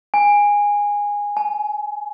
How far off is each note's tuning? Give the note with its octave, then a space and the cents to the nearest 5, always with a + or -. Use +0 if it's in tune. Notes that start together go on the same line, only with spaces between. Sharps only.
G#5 -15
G#5 +30